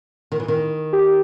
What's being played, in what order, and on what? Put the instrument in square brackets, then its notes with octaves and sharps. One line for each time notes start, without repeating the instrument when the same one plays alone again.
[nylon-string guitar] D#3
E3
D#3
[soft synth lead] G4